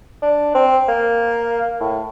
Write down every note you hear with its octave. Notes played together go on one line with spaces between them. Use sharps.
D4
C4
A#3
A2